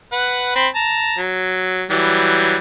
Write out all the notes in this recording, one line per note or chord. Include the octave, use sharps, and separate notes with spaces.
B4 F#5
C4 B5 C6
A5 A#5
F#3
E3 F#3 G3